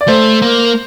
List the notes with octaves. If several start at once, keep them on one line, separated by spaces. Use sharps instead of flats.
D5
A3 C5
A#3